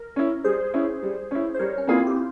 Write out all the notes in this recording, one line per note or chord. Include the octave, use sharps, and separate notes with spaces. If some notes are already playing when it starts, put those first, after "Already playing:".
Already playing: A#4
C#4 E4
G3 G#4 C5
C#4 E4
G3
C#4 E4
C5
G3 A#4 C#5
C#4
A#3 C4 E4 F4 G#4
G4
F4